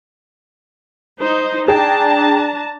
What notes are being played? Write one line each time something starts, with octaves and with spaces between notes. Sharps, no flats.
D#4 C5
D4 G#4 G5 A5 A#5